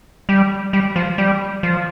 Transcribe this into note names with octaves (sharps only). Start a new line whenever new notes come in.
G3
G3
F3
G3
F3